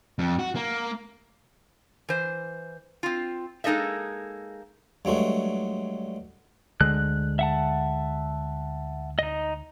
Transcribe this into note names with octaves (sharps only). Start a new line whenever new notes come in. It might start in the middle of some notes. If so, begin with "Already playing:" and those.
F2
F#4
A#3
E3 C5
C4 F4
G#3 A#3 D#4 A4 D#5 E5
G2 F#3 G#3 A3
D2 D3 G#3 F#6
E5 F#5 A5
D#4 D#5